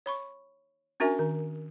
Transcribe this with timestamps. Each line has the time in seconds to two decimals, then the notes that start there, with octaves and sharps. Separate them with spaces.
0.06 C#5 B5 C#6
1.00 C#4 D4 F#4 A#4 E5 G#5
1.19 D#3